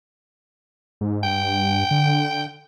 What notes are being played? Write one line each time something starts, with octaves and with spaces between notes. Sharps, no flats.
G#2
G2 G5
D3